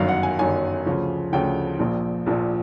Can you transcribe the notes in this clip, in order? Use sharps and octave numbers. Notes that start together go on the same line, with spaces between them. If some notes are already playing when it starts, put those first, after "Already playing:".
Already playing: G1 F#2 D#3 F#3 F5
F#5
G#5
G1 F#2 D#3 F#3 G#5
D2 C#3 F3
D2 C#3 F3 G5
A#1 A#2 F3
A#1 A#2 F3